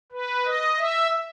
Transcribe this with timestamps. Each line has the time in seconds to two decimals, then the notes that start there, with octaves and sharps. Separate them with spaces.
0.12 B4
0.45 D#5
0.78 E5